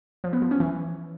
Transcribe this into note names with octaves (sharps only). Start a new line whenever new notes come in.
F3
B3
F3
C#4
E3